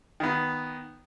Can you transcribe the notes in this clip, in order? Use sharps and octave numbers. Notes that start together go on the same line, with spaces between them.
D#3 B3